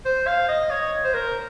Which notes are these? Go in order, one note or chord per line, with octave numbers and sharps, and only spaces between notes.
C5
F5
D#5
C#5
C5
A#4